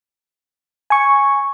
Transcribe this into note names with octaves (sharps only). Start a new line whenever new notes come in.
G#5 C#6